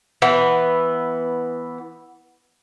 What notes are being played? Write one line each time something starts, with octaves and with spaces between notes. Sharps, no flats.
E3 B3